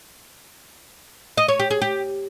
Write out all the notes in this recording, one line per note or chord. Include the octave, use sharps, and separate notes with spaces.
D#5
C#5
G4
G#4
G4